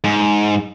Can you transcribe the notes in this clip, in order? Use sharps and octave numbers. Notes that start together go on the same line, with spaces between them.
G#2